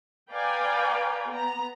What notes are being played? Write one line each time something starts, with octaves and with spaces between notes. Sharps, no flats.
B4 D5 F5 G5 G#5 A#5
B3 A#5